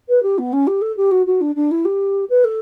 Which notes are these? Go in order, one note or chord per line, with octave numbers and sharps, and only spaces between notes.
B4
G4
B3
C#4
G4
A4
G4
F#4
F#4
D4
D4
E4
G4
B4
A4